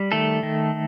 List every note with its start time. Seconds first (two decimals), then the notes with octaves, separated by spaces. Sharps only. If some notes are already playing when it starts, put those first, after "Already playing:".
Already playing: G3
0.12 D#3 A3 A4
0.43 D#3